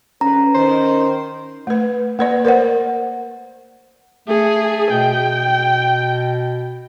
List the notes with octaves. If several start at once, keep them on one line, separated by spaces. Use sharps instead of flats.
G#2 D3 C#4 B4 A#5
D#3 C5
A3 B4
A#3 B4 D5
A#4 C5 D5 F#5
A3 G#4
B2 G5